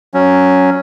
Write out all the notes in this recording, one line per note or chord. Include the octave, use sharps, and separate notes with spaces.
F#3 C#4